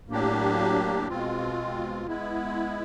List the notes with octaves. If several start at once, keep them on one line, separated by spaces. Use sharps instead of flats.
A2 F#3 A#3 D4 G4
B2 G#3 C4 F4
G#3 B3 E4